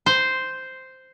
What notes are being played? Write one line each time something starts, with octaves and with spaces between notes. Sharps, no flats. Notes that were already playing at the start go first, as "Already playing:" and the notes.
C5